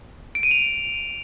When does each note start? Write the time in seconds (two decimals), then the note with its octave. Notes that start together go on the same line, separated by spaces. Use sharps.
0.35 D7
0.43 D#7
0.51 F7